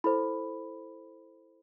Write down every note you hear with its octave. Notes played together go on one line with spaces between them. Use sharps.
E4 A4 C5 B5